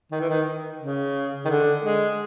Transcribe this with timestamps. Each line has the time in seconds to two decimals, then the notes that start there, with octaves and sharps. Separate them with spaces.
0.12 D#3
0.21 E3
0.30 D#3
0.81 C#3
1.45 D#3
1.49 D3
1.84 G#3